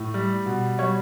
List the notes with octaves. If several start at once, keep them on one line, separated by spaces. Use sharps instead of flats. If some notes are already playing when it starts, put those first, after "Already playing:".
Already playing: A2
G3
B2
G3 C#5